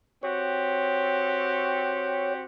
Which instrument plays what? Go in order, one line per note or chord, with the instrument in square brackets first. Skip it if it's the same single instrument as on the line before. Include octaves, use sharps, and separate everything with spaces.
[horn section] C4 F#4 G4 [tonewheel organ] C#5